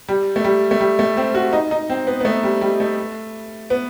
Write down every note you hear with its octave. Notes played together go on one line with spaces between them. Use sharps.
G3
A3
G3
A3
G3
A3
C4
F#4
D#4
D#4
C4
B3
B3
A3
G3
G3
A3
B3